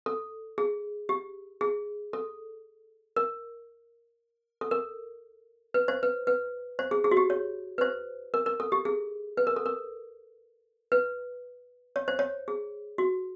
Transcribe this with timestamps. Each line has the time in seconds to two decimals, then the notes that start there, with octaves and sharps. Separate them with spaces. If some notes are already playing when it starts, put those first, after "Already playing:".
0.06 A4
0.58 G#4
1.09 G4
1.61 G#4
2.13 A4
3.16 A#4
4.61 A4
4.71 A#4
5.74 B4
5.88 C5
6.03 B4
6.27 B4
6.79 C5
6.91 G#4
7.04 G#4
7.11 F#4
7.17 G4
7.30 C#5
7.78 B4
7.81 C5
8.34 A#4
8.46 A#4
8.60 A4
8.72 G4
8.85 G#4
9.37 B4
9.47 A#4
9.56 A4
9.66 A#4
10.92 B4
11.96 C#5
12.08 C5
12.19 C#5
12.48 G#4
12.98 F#4